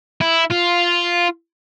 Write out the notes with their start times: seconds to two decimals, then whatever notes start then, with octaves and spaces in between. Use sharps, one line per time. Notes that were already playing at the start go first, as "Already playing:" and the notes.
0.21 E4
0.50 F4